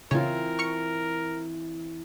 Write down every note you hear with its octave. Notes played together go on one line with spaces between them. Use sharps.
C#3 E3 C4 F4 A#4 C#5
C#6 F6 C#7